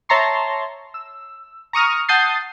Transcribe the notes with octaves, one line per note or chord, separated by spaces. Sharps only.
C#5 E5 A5 A#5 C6 C#6
E6
A#5 C#6 D#6 F6
F#5 A5 D#6 G6 A6 C7